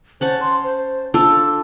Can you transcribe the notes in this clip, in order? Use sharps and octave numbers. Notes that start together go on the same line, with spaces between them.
C#4 C5 F#5 A5
C6
C5
D4 F4 A4 E6